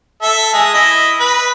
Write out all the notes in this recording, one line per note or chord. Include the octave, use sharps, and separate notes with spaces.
A4 E5
G#3 G#4
E4 D#5
B4